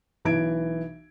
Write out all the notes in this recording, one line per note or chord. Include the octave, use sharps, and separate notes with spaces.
B1 E3 G#6 D7